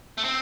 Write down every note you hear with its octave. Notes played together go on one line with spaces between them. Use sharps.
A3
C4